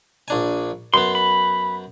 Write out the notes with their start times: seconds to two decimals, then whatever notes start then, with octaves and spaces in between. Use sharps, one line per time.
0.28 A#1 D4 G#5
0.94 F#2 B3 C6
1.15 B5